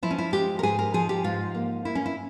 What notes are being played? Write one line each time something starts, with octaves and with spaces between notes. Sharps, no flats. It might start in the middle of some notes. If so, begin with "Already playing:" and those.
F3 E4
C#4
E4
G#3 G4
A#4
G#2 G#4
A#4
F3 G#4
G4
G#2 F4
A#3
A#3 E4
C#4
E4